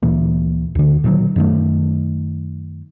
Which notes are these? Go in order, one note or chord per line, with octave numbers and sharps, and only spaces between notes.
D2 A#2 E3 A#3
D2 D3
A#2 D#3 E3 F#3
F#2 D#3 A3